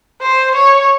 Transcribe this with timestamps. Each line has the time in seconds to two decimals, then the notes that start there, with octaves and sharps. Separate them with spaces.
0.22 C5
0.56 C#5